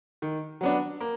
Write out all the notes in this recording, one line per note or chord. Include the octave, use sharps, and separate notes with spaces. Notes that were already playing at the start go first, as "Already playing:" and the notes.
D#3
F#3 B3 D4
A#3